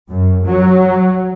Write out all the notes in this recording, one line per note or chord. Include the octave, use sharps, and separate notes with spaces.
F#2
F#3